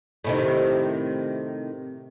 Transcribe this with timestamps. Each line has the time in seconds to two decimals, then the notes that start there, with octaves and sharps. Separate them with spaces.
0.24 A2 C3 D#3